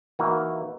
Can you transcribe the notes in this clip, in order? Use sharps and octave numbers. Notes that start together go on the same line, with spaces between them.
E3 A#3 D#4 F#4 B4